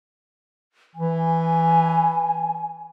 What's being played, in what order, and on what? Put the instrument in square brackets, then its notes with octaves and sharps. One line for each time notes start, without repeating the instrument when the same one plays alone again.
[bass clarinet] E3 [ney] G#5